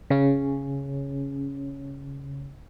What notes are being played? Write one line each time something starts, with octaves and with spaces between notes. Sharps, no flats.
C#3 C#4